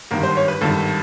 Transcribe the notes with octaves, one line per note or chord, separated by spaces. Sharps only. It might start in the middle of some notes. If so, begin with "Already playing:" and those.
G#1 G2 D#3 A#4
C5
C#5
B4
G#1 G2 D#3 A4